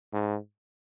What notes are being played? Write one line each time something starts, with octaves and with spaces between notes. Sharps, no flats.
G#2